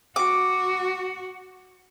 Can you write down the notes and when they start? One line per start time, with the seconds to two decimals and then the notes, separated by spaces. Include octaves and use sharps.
0.16 F#4 D6